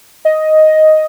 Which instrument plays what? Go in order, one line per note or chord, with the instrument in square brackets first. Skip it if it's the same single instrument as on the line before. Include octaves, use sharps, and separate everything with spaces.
[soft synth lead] D#5